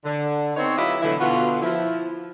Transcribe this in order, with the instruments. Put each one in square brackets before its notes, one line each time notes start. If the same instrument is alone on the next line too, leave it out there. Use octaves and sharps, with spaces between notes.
[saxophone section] D3
B3 C4 D#4 C#5
F#3 E4 F4 G4 B4 D#5
B2 D3 E3 F#3 A3 E4
B2 D3 B3 F4 F#4
F3 E4